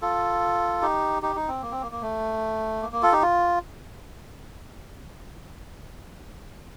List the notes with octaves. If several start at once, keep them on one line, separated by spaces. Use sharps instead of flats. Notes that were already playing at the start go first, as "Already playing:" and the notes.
F4 A4
D#4 G4
D#4 G4
D#4
C4
A#3
C4
A#3
A#3
A3
A#3
A#3
F4 A4
D#4 G4
F4